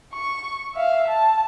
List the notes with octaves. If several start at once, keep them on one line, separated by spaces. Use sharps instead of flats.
C#6
E5 F5
A5